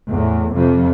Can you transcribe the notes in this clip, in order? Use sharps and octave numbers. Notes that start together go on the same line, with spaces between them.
E2 A2
F2 C3 F3